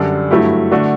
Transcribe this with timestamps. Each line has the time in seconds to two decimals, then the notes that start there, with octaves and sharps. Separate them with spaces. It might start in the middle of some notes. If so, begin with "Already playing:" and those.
Already playing: F#2 D3 G3 D4
0.31 G2 F#3 A3 E4 G4
0.71 D3 A3 D4 F#4